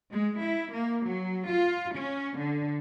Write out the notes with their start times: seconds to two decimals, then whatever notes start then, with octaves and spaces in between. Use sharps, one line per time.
0.12 G#3
0.42 E4
0.75 A#3
1.05 F#3
1.49 F4
1.95 C#4
2.39 D3